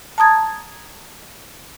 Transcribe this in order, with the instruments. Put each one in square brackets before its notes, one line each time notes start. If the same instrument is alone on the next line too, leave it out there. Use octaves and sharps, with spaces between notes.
[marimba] A5 A#5 D#6 G#6 A6